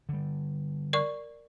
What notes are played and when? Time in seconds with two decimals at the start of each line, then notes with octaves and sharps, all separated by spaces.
0.09 D3 G3
0.93 A#4 D5 C#6